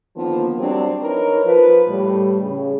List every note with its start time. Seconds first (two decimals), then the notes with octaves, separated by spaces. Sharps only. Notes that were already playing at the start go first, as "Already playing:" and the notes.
0.16 D3 D#3 F3 A#3 B3
0.58 F#3 G3 C4 D4
1.01 D#4 E4 A#4 B4 C#5
1.44 F3 B4
1.88 A2 G3
2.41 C#3